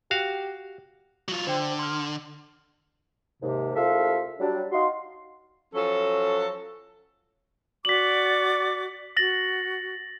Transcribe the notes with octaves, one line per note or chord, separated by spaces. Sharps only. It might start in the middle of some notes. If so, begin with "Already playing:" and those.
F#4 G4 F5
F#3 F4
D3 C5 G5
C6 F6
D#2 G#2 C3
C2 G#2 F4 A4 E5 F5
F#3 G3 D4
D#4 F#4 D#5 F5 C6
F3 F#3 C#4 A4
F#4 D5 D6 B6 F#7
F#4 A6 A#6 F#7